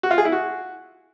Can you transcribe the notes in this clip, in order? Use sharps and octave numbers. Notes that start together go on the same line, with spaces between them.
F#4
F4
G#4
E4
F#4